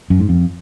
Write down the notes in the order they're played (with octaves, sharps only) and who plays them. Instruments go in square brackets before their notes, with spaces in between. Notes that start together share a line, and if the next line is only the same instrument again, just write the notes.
[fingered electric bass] F#2
G#2
F2